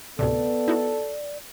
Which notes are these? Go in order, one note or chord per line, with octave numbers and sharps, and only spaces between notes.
D2 A2 C3 B3 A4 D5
D#4 E4 F#4